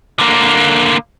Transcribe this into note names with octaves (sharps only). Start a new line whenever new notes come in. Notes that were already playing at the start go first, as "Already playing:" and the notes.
D3 A#3